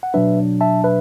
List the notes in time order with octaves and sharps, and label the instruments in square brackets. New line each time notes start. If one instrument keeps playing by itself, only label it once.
[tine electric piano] F#5
B2 F#3 D4 B4 E5
E5 A5
B4 E5